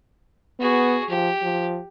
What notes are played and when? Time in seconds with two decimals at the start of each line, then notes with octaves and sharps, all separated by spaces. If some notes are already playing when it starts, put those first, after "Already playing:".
0.60 B3 F#4 G#4
1.09 F3 G4
1.42 F3